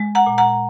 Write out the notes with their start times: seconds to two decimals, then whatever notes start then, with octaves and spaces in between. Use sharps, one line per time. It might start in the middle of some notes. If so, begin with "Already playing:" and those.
Already playing: G#3
0.15 F#5 A#5
0.26 A#2
0.38 F#5 A#5